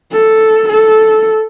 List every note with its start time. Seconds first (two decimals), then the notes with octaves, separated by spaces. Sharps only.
0.12 A4
0.69 A4